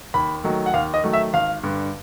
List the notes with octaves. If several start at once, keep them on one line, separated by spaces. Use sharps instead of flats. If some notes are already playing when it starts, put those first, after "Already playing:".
D#2 B5
D#3 F#3 A3
F#5
D#2 F5
D#5
D#3 F#3 A3
E5
G#1 F5
G2 D3